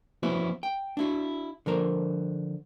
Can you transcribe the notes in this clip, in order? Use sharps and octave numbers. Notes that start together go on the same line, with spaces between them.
F3 B3 C#4 E4 F#4
G5
D4 E4 F#4
D3 F3 A#4 C5